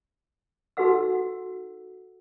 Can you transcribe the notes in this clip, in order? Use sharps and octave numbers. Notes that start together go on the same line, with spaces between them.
D#4 F#4 A4 B4 F#5 E6